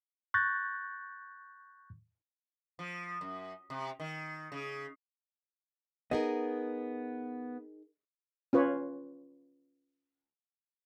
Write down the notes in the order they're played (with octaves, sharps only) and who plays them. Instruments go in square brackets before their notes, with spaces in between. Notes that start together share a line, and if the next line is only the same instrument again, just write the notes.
[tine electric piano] C#6 F#6 G6 A6 A#6
[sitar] F3
F#2
C3
D#3
C#3
[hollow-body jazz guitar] B3 D#5 [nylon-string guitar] D#4 G#4 A#4
[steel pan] C#4 F4 B4 C#5